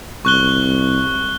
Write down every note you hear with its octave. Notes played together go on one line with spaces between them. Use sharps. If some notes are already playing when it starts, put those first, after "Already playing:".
C2 C#6 F#6 G7